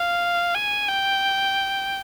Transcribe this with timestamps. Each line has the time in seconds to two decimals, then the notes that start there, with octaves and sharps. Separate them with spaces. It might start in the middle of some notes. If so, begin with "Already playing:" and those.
Already playing: F5
0.55 G#5
0.89 G5